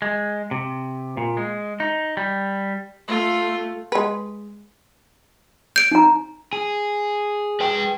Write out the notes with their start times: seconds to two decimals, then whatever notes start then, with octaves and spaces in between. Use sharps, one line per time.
0.02 G#3
0.51 C3
1.17 A#2
1.37 G#3
1.80 D#4
2.17 G3
3.08 A3 F4
3.92 G#3 B4
5.76 G6 D7
5.91 D#4 A#5
6.53 G#4
7.60 B4 G5